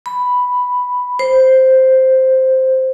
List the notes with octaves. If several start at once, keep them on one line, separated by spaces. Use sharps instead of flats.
B5
C5